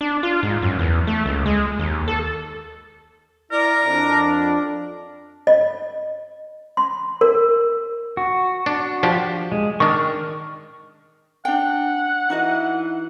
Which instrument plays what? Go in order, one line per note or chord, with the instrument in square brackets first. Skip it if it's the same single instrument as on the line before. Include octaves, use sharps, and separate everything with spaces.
[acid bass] D4
F4
G#2
F#2
E2
A3
C#2
G#3
D#2
A4
[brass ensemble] E4 D5 [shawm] A#4
[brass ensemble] F2 D4
[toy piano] D#5
C6
A#4
[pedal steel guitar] F#4
[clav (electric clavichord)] D4
F3 D4 G4
[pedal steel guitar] G#3
[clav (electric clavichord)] D#3 D4 [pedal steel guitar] C#6 F6
[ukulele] D4 G5 [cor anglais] F#5
[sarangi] E3 [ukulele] D#4 F#4 D#5